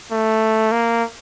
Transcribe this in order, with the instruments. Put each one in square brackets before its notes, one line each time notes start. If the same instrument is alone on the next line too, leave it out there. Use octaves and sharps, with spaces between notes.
[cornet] A3
A#3